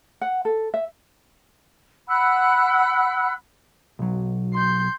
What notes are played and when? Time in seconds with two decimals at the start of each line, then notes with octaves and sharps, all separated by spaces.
0.21 F#5
0.45 A4
0.74 E5
2.07 F#5 B5 E6 F#6
3.99 B1 F#3
4.54 C6 G6